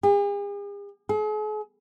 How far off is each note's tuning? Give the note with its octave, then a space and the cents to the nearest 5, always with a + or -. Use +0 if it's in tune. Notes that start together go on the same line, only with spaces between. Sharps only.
G#4 -45
G#4 +45